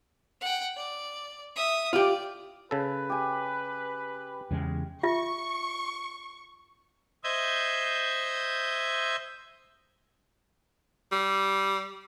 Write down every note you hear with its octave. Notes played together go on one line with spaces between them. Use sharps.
F#5 G5
D5
E5 D#6
F4 G4 D5
C#3 A4 B4
G4 G#5
E2 C#3 G#3
F4 E5 C#6
C5 D#5 E5 G6 G#6
G3